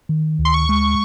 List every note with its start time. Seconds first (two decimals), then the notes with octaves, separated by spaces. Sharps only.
0.09 D#3
0.39 D2
0.45 C6
0.54 C#6
0.69 G#3